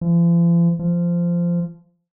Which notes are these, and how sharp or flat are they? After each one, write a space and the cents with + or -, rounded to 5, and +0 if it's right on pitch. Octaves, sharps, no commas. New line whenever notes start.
F3 -45
F3 -15